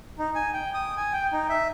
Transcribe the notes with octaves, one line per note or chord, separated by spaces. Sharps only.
D#4
G#5
G5
D#6
G#5
G5
D#4
E5